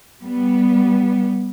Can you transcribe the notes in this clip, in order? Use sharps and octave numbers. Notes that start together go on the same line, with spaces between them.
G3 B3